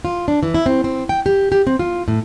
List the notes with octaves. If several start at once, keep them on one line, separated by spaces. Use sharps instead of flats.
F4
D4
E3
E4
C4
C4
G5
G4
G4
C4
F4
A2